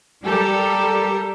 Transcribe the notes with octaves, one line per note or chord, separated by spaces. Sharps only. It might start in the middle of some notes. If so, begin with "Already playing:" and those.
G3 G4 A4 A#4